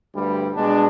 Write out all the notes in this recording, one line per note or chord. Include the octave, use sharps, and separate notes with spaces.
D2 G2 G3
B2 G#3 D4